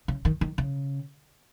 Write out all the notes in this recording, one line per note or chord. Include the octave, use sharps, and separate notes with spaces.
C#3
D#3
D#3
C#3